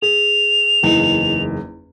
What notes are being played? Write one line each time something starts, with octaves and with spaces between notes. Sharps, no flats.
G#4 F7
F#1 E2 D#4